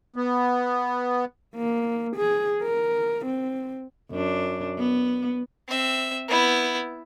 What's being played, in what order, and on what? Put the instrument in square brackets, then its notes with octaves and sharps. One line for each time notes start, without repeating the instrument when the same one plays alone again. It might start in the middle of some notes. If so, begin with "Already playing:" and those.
[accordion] B3
[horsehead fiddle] A#3
G#4
A#4
C4
[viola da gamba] F#2 D4
B3
[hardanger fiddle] C4 E5
B3 E4